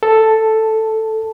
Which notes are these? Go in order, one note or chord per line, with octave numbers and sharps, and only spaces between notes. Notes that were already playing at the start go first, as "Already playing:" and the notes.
A4